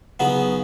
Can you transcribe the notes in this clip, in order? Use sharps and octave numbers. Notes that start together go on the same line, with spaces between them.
C#3 F#3 B3 D#4